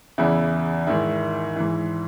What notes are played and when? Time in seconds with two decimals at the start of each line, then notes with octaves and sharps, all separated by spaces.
0.18 E2 C#3 E3 E4
0.87 G#2 D#3 E4
1.56 G#2 E3